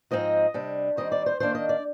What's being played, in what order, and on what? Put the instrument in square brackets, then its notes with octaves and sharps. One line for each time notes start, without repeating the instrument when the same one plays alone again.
[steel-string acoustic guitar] G#2 F3 C4 D#4 D#5
C3 G3 D4
D#3 G3 C4 D#5
D5
C5
D#3 A#3 D4 C5
D#5
D5